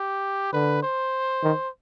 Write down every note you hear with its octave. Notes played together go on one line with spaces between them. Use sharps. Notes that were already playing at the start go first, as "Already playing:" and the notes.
Already playing: G4
D3 B4
C5
D#3